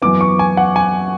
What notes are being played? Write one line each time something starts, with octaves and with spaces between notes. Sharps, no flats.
F#2 E3 B3 D6
C#6
G#5
F#5
G#5